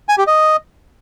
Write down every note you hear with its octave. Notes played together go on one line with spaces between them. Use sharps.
G#5
G4
D#5